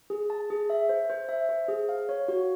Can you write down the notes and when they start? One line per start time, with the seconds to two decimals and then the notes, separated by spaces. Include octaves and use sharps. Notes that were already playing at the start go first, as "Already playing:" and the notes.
0.10 G#4
0.30 A5
0.50 G#4
0.70 E5
0.89 C5
1.10 C5
1.29 E5
1.49 C5
1.68 G#4
1.89 F5
2.09 C#5
2.28 F#4